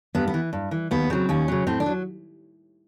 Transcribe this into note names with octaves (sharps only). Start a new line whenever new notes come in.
G2 B3
B3
E3
G2
E3
D#2 B3
C#3 F#3 C4
D#2 C#4
C#3 F#3
A2 C4
D4
F#3